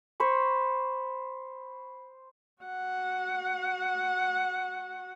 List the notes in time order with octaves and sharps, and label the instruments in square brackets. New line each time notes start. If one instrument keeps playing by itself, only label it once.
[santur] C5 B5 C#6
[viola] F#4 F#5